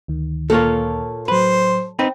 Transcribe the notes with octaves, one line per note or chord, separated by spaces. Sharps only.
D2 D#3
A#2 A#3 F4 A4 C#5
A2 F#3 B4 C5
C4 D#4 B4 G5